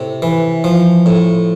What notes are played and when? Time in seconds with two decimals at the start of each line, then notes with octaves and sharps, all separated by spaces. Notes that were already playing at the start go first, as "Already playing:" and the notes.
Already playing: A2 C3
0.22 E3
0.64 F3
1.06 A2